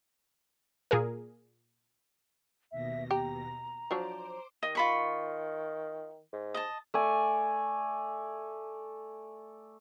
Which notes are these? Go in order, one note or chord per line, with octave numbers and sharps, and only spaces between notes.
A#2 G#4 A#4
D#2 B2 E5 A#6
G4 A#5
F3 F#3 D4 C5 D6
D#3 D#5
F4 B5 C#6
G#2
D#5 A5
A3 D5 G#5